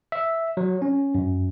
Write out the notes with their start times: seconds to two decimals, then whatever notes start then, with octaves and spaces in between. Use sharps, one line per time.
0.12 E5
0.57 F#3
0.82 C#4
1.15 F#2